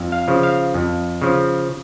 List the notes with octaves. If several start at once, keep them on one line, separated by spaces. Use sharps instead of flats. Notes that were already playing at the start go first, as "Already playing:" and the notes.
Already playing: F2
F5
C#3 F3
F5
F2
C#3 F3